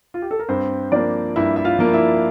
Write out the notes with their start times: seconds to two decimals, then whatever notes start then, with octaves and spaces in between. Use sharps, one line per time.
0.14 F4
0.22 G4
0.31 A4
0.39 A#4
0.48 G2 C4 C5
0.92 F3 A#3 D4 D5
1.36 G2 E4 E5
1.56 E5
1.64 F4 F5
1.79 F3 A#3
1.93 E4 E5